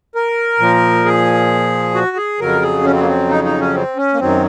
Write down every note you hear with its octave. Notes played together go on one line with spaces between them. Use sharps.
A#4
A#2 F3
G#4
F#4
G#4
F2 C#3 F#3 A#4
G#4
C#4
C4
A#3
C4
D#4
D#4
C#4
C4
C#4
A#3
F#2 D#3 F#3 C4